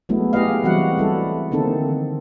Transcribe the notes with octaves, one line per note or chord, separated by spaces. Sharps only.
F#3 G#3 A3 B3 E4
E4 G4 G#4 B4 D#5 F5
E3 F#3 G3 C4 F#4 F#5
G3 E4 A4
D3 D#3 A#3 C4 D#4 A4